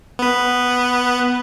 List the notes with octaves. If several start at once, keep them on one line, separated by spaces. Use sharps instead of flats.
B3 B4